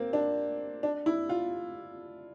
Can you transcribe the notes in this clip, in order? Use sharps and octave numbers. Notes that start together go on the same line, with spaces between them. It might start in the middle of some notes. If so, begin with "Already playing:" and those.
Already playing: A#3 C4
D4
D4
E4
F4